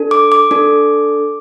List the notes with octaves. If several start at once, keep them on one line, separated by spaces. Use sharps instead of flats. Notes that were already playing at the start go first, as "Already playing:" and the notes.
Already playing: D4 A4
D6
D6
D4 A4